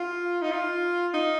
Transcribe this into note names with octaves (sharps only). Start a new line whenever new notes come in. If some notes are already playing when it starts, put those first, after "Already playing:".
Already playing: F4
D#4
F4
D#4